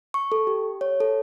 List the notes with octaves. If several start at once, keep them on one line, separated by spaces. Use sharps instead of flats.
C#6
A4
G4
C#5
A4